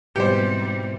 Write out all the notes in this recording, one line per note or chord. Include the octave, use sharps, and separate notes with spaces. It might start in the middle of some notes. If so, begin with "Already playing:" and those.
G#2 B2 E3 G3 C4 G4 C5